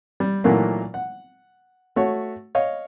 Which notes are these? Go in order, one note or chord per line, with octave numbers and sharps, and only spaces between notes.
G3
A#2 D#3 E3 F#3 A3 A#3
F#5
A3 F#4 C#5
C#5 D#5 F5